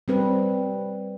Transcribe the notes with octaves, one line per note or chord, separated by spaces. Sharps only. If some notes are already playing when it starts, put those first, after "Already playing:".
G3 C4 B4